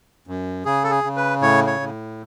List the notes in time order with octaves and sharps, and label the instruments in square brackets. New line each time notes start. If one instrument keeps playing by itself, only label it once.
[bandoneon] F#2
C#3 G#4
A4
G#4
C#3
B4
A2 C#5
C#5
A2